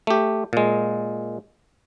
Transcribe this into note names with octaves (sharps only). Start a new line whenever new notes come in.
A3 G4
A#2 G#3